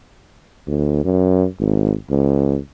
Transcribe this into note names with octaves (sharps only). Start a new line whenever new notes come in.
D2
F#2
G#1
C#2